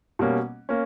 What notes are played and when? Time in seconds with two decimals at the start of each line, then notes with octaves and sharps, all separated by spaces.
0.19 B2 G3 A#3 C#4
0.69 A#3 C#4